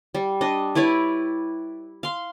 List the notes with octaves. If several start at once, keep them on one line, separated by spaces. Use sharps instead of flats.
G3
D4 D#5
E4 B4 C#5 D5
F5 C6